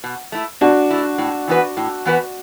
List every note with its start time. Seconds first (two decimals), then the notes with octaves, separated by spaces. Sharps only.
0.04 B2
0.32 A3 E4
0.61 B2 D4 F#4
0.91 A3 E4
1.18 A2
1.48 E3 B3 F#4 B4
1.77 A2
2.05 E3 B3 F#4 B4